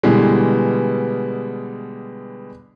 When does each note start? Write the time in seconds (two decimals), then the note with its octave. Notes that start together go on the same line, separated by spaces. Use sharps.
0.03 B2 D3 E3 G3 G#3